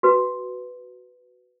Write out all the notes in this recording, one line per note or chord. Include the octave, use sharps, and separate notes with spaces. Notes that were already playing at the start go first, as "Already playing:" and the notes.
F#4 B4